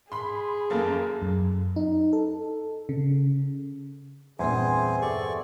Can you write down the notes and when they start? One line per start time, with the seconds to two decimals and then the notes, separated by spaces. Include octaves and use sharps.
0.12 G#4 B5 C6
0.70 F#2 A#3 A4
1.22 F#2
1.76 D#4
2.13 A4
2.89 C#3
4.39 E2 G2 A#2 C4 D4 G#4 C5 G#5
5.02 G4 A4 D5 E5 C#6